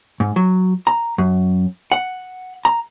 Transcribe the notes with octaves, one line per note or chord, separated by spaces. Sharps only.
G#2
F#3
A#5
F#2
F#5
A#5